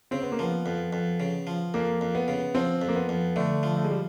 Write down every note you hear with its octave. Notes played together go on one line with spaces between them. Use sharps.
C#3 C4
B3
A#3
F3 B3
F2
F2
C#3
F3
F2 A#3
F2
B3
C#3
F3 C4
F2
A#3
B3
F2
D3 A3
F3
A3
G#3
G3